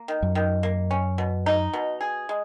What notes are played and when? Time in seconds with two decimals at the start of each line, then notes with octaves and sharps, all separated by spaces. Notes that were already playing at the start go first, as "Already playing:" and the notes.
Already playing: A#3
0.08 D#3
0.22 F#2
0.35 D#3
0.63 A#3
0.91 C#4
1.18 B2
1.46 D#4
1.73 B2
2.01 G#4
2.29 G#3